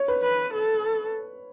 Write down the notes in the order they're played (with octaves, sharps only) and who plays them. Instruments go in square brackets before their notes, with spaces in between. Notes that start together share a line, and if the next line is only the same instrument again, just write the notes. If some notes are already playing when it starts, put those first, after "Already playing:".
Already playing: [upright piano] C#5
B4
[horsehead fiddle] B4
A4